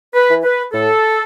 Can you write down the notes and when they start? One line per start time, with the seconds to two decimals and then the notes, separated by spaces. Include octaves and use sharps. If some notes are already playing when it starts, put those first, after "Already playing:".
0.14 B4
0.29 E3
0.44 B4
0.72 A2 A4